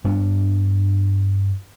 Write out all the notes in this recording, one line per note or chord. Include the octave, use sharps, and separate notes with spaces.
G2 G3 B3 D4